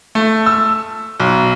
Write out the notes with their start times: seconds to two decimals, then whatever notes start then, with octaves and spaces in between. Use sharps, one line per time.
0.15 A3
0.46 E6
1.20 B1